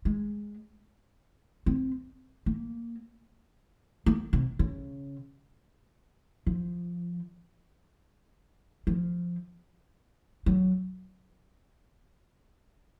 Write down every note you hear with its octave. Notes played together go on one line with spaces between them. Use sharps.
G#3
C4
A#3
A#3
C3
C#3
F3
F3
F#3